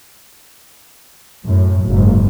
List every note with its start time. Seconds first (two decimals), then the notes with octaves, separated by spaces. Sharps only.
1.45 F#2 A2
1.85 F#1 G#2